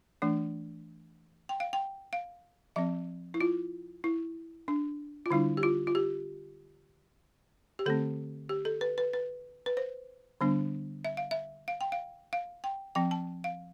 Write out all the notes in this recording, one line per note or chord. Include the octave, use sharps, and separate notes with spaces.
E3 A3 D4
G5
F5
G5
F5
F3 C4 E5
E4
F4
E4
D4
F4
D3 G3 D4 E4
G4
F4
F4
G4
G4
D3 A3 C4 A4
G4
A4
B4
B4
B4
B4
C5
D3 G3 B3 D4
E5
F5
E5
F5
G5
F5
F5
G5
F3 C4 G5
A5
F5